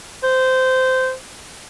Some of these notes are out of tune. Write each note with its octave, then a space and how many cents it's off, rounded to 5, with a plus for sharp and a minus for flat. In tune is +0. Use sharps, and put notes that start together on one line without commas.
C5 -15